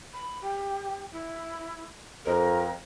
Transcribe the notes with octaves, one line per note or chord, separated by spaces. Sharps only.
B5
G4
E4
F2 A#4